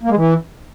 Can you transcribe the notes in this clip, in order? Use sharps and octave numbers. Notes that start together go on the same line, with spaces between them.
A#3
G#3
E3